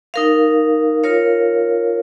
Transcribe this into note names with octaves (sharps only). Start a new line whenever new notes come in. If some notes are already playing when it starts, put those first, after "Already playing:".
D#4 A#4 F5
F4 A#4 C#5 F5